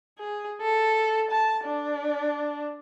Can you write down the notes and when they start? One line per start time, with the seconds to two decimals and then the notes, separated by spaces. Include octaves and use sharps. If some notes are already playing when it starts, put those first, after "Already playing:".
0.19 G#4
0.62 A4
1.31 A5
1.65 D4